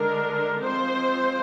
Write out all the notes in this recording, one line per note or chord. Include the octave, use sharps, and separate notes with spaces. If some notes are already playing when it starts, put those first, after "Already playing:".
Already playing: D3 G#3 D4 A#4
F3 G#3 C4 C5